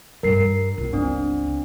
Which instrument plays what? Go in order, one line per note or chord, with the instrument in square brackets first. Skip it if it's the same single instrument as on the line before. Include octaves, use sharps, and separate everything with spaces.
[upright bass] G2 G3 [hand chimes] A#4 C7
[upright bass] G1 C#2
[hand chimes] C4 D4